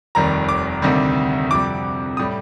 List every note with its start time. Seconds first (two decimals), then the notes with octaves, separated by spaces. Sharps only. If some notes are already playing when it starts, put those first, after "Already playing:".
0.15 F1 D#2 D#3 G3 A#5
0.49 D6
0.82 D2 C3 D#3 G3
1.50 F2 C3 G3 D6
2.17 A2 G3 D#6